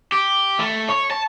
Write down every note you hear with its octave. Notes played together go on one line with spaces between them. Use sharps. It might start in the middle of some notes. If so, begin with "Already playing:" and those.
G4
A3
C#5
A5